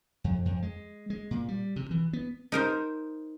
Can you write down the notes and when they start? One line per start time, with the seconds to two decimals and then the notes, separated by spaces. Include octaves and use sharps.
0.24 F2
0.45 F2
0.62 G#3
1.10 G#3
1.31 A#2
1.48 G3
1.76 C3
1.91 E3
2.13 B3
2.52 D#4 A#4 C5